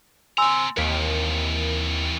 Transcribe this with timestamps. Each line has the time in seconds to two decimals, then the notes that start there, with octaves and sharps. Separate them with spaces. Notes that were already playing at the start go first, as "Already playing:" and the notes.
0.38 C4 G#5 A#5 C6 E6
0.77 D#2 E3 C4 A#4 B6 D7